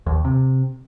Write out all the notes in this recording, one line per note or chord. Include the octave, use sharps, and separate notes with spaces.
D#2
C3